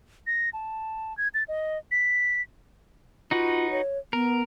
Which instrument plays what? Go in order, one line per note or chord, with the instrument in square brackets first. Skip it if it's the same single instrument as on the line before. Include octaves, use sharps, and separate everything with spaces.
[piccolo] A#6
A5
G#6
A6
D#5
B6
[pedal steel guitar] D#4 F#4 B4 [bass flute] F4
[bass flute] C#5
[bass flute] B3 [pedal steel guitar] A#4